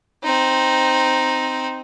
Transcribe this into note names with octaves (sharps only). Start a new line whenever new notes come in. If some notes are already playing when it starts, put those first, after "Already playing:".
C4 D#4